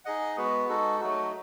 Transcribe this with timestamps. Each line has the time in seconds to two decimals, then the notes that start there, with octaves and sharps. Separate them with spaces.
0.05 D#4 G#4 D#5 F#5
0.37 G#3 B3 F#4 B4
0.69 G#3 D#4 F#4 A4
1.00 F#3 A3 D#4 F#4